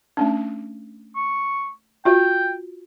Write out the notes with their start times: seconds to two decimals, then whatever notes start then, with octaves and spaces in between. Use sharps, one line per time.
0.17 A3 C#4 D4
1.15 C#6
2.05 F4 F#4 G5